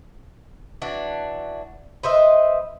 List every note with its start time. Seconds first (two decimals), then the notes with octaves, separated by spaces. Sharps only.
0.82 E3 D4 F#4
2.03 B4 C5 D#5 E5